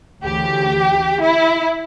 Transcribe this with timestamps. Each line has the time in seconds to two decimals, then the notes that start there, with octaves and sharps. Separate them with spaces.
0.23 D2 C#3 E3 G4
1.20 E4